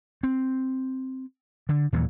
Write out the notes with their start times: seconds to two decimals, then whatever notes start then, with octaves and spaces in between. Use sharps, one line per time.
0.23 C4
1.69 D3
1.93 D#2 A#2 E3 F#3